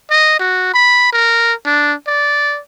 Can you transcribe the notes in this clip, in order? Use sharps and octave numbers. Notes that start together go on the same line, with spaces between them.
D#5
F#4
B5
A#4
D4
D5